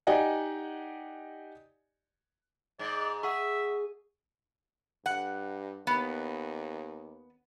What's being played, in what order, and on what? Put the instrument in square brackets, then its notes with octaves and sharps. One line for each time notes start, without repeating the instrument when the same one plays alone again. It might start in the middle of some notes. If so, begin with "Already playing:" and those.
[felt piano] D#4 G4 D5 D#5 F#5 G#5
[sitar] G#2 [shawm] D5
[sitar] G#4 [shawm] E5 [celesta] F#5 C#6
[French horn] G2 [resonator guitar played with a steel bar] F#5
[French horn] D#2 [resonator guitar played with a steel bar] B3